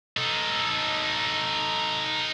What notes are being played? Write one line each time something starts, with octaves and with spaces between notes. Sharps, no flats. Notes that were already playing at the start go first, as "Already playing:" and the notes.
D#4 A4